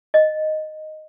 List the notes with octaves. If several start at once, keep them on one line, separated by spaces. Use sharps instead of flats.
D#5